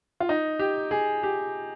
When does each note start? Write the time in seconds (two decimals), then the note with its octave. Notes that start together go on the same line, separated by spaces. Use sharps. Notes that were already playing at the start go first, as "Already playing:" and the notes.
0.20 F4
0.29 D#4
0.59 G4
0.91 G#4
1.23 G4